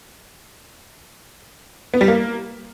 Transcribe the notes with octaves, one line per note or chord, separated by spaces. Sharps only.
B3
G3
A#3